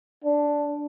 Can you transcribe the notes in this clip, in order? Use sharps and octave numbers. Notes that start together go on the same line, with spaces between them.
D4